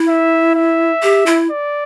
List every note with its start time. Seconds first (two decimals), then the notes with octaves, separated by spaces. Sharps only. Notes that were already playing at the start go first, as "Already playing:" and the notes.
Already playing: E4
0.08 E5
0.55 E5
1.03 G4
1.26 E4
1.50 D5